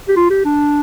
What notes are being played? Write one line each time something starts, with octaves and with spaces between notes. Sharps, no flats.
G4
F4
G4
D4